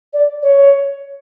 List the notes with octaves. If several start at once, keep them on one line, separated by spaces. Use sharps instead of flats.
D5
C#5